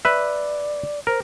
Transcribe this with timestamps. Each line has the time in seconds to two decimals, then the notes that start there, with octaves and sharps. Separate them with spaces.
0.05 B4 D5 E5
1.07 A#4 C5